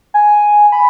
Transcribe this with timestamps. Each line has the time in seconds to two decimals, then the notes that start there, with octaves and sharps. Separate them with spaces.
0.14 G#5
0.72 B5